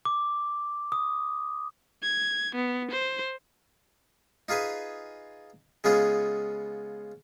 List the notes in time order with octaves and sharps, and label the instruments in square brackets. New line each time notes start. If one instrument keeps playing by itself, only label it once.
[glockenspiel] D6
D#6
[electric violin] G#6
B3
C5
[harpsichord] D#4 F4 G#4 B4 G#5
C#3 G#3 B3 F4 G#4